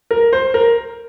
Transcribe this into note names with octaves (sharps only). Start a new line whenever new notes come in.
A#4
C5
A#4